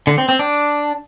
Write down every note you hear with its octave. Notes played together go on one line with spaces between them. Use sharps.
D3
C4
C4
D4